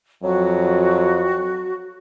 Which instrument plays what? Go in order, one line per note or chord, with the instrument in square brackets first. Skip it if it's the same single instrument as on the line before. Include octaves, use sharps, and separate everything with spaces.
[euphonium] F2 [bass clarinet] F#3 [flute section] F#4